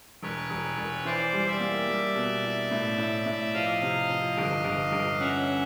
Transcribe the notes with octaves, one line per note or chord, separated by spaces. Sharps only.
E1 B4 C#5
E1
E1
E3 C5 D5
G3
D5 E5
A#3
G3
B2
E4
A2
A2
A2
F3 D#5 F5
C3
F3
G1
G1
G1
C#4 E5 F#5
C#4